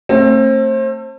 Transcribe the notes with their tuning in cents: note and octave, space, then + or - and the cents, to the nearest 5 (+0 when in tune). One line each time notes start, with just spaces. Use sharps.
A3 +30 C4 +35